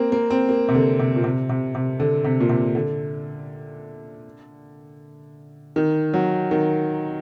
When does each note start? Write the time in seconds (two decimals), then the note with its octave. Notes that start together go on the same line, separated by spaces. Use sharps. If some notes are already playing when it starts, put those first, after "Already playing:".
Already playing: A#3 C4
0.12 A#3
0.30 C4
0.49 A#3
0.69 C3
0.75 D3
0.99 C3
1.16 A#2
1.24 C3
1.49 C3
1.75 C3
2.00 D3
2.24 C3
2.40 A#2
2.49 C3
2.75 D3
5.76 D#3
6.14 F#3
6.51 D#3